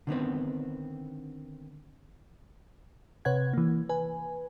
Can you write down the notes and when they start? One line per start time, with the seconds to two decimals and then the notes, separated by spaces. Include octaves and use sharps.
0.07 D3 D#3 B3 C4
3.25 C3 B4 C#5 F#5 G#6
3.53 E3 A#3
3.89 B4 G#5